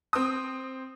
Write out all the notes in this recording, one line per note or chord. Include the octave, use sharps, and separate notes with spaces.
C4 D#6